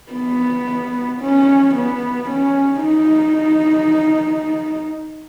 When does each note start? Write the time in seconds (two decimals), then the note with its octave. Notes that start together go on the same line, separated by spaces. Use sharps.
0.12 B3
1.21 C#4
1.75 B3
2.30 C#4
2.83 D#4